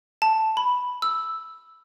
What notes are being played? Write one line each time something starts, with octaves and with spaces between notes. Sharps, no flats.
A5
B5
E6